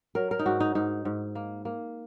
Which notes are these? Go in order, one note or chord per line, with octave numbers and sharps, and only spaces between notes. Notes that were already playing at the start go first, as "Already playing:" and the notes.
F#3 A#4
A#4
D#4
G#2 F#4
D#4
G#2 D#4
G#2
A#3
A#3